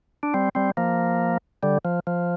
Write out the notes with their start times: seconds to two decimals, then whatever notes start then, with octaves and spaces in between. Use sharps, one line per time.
0.23 D4
0.34 G3 C4
0.55 G3 C4
0.77 F3 A#3
1.63 D3 G3
1.85 F3
2.07 F3